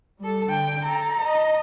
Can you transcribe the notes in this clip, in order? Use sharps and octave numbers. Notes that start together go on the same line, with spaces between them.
G3 A4
D3 G5
A4 A#5
D#5